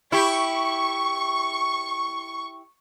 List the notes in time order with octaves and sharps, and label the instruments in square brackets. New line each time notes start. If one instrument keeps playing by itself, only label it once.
[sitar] E4 G4 [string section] C#6